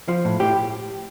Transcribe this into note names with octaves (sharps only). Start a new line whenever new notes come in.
F3
A2
A2 G4